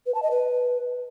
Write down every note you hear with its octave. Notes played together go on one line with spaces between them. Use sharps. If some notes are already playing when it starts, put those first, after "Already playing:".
B4
A5
D#5
B4